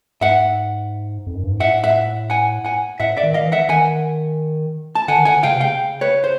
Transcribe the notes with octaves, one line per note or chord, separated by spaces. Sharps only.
G#2 E5 F#5
F2
F#2
G2
G#2
A2 E5 F#5
E5 F#5
F#5 G#5
F#5 G#5
A2 E5 F#5
D5 E5
D#3
D#3 D#5 F5
E3
E5 F#5
D#3 F#5 G#5
A5
D3 F#5 G#5
D#3
D3 F#5 G#5
C#3 F5 G5
C3
C#3 F5 G5
B4 C#5
C5